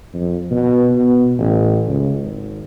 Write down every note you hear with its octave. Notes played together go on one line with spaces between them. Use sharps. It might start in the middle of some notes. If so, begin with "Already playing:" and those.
F2
B2
B2
A1
C#2
G#1